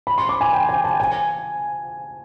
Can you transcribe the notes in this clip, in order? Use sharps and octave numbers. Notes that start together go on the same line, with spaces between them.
B5
C6
D6
G#5
G5
G#5
A5
G#5